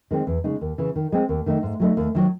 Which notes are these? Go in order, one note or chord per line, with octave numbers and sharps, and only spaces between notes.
D#3 G#3 C4
E2
C#3 G#3 D#4
D#2
C#3 E3
D#3
G#3 C4
D#2
D#3 A3 D#4
G#2
F#3 A3 D#4
D#2
D#3 F#3